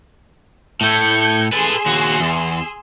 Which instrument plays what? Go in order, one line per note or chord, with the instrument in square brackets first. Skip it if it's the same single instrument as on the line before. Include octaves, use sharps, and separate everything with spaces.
[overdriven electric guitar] A2 A3 [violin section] G6 G#6 C#7
[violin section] G#4 C6 E6 [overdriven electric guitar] A4 B4
[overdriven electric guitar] D#2 F#4
E2